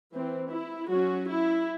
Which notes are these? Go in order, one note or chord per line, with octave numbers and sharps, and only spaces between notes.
E3 C4
E4
F#3 F#4
C#4
E4